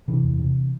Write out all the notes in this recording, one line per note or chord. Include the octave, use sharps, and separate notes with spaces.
C3 E3
E2
C3